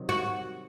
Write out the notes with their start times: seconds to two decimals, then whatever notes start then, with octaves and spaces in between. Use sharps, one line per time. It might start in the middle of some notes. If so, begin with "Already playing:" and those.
Already playing: C3 D#3 F#3
0.09 F#4